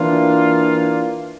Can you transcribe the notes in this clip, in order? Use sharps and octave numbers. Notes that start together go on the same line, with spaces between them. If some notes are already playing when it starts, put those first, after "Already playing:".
Already playing: E3 A#3 D4 F4